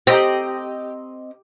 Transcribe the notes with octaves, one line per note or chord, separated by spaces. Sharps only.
C4 G4 C5 D#5 A#5